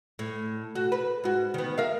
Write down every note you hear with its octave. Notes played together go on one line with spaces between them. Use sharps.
A2
F#4
B4
G#2 F#4
D#3 B3
A#4 E5 F5